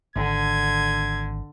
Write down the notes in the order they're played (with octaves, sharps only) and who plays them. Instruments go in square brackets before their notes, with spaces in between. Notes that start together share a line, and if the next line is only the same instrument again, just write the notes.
[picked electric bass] G#1 [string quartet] D3 [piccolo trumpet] G#6